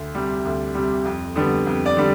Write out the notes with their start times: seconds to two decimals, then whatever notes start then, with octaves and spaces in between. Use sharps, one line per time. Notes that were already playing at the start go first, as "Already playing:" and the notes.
Already playing: D2
0.15 C3 G3
0.45 D2
0.74 C3 G3
1.05 F2
1.36 D3 G3 B3
1.67 F2
1.86 D5
1.97 D3 G3